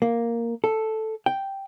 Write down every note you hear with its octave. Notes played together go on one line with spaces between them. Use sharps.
A#3
A4
G5